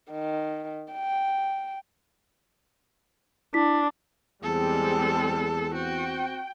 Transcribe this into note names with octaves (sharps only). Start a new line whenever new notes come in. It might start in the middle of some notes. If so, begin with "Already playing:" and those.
D#3
G5
D4 E4 B6
E2 G3 G#3 C4 G#4 A4
G#4
C4 F#4 G5